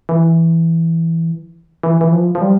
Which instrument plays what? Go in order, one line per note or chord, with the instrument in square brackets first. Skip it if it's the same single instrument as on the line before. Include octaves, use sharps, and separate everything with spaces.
[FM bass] E3
E3
E3
F3
F3
G3